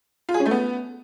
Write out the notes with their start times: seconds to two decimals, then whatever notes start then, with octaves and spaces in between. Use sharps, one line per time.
0.29 F4
0.34 G#4
0.40 C#4
0.46 A3
0.51 B3